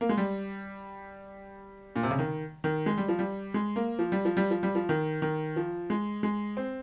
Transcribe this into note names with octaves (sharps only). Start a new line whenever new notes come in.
A#3
G#3
G3
A#2
C3
C#3
D#3
D#3
G#3
G3
F3
G3
G#3
A#3
F3
G3
F3
G3
F3
G3
F3
D#3
D#3
F3
G#3
G#3
C4